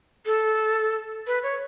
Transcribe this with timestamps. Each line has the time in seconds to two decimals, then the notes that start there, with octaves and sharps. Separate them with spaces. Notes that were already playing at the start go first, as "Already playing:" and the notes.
0.26 A4
1.27 B4
1.43 C#5